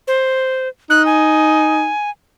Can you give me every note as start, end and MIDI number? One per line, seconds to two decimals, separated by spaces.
0.07 0.68 72
0.90 1.90 63
0.90 1.05 90
1.06 2.10 80